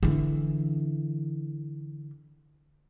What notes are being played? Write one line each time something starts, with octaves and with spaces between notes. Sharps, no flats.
D3 E3